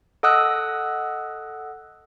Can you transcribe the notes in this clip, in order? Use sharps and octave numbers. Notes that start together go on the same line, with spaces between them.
A4 D#5 F#5 D#6 E6 F#6